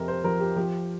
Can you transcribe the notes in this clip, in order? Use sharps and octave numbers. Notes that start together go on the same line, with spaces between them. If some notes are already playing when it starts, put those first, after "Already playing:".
Already playing: F2 C3 C4 A#4
C5
F3 A#4
G4
F3 G4